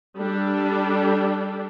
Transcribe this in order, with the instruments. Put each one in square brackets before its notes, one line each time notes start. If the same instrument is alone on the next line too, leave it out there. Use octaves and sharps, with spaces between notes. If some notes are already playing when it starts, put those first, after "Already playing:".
[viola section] G3 D4 G4 A4